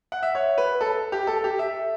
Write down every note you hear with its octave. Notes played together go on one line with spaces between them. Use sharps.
F#5
E5
C#5
B4
A4
G4
A4
G4
E5